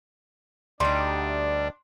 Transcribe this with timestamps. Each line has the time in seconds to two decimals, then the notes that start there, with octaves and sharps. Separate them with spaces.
0.80 D2 G3 D4 D#4 C6